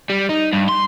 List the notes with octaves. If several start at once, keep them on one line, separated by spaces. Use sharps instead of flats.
G3
D#4
G2
C6